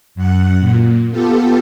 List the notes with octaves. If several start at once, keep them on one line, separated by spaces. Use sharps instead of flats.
F#2 F#5
A#2
B3 F4 G4 A4